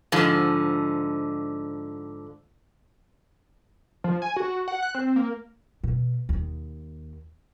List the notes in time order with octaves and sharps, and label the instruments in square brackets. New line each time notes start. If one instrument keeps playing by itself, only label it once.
[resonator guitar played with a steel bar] G#2 D3 F3
[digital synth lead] F3
G#5
F#4
F#5
F#6
C4
A#3
[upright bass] B2
D#2